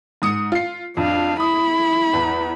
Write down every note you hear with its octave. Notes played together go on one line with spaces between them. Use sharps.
G#2 D#6 C#7
F4 C7
F2 D4 F5
E4 B5 D#6
E2